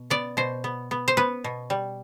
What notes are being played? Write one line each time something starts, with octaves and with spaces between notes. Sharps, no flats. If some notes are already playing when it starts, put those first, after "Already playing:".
Already playing: B2
B3 D5
B2 C5
B3
B3
C5
B3 B4
B2
G3